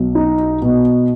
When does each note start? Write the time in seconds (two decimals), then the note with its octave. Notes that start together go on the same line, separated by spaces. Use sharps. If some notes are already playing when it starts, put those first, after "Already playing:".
Already playing: B1 F#3
0.15 D#4
0.62 B2